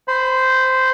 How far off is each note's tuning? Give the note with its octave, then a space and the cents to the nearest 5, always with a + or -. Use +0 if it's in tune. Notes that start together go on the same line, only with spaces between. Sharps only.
C5 -10 B5 +15